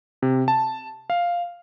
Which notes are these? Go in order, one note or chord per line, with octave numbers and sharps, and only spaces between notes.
C3
A5
F5